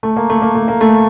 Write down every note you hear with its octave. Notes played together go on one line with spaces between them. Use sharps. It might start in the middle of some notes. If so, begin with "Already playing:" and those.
A3
A#3
A3
A#3
A3
A#3
A3